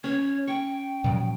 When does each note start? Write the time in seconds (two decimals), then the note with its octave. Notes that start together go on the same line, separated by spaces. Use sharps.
0.04 C#4 C#5
0.47 G5 C#6
1.04 A#2 F3 F#3